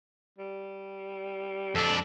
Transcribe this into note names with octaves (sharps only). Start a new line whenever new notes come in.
G3
F2 D4 A4